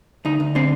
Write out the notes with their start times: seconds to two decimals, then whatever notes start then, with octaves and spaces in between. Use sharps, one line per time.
0.25 D2 D#4
0.40 D2
0.55 D3 C4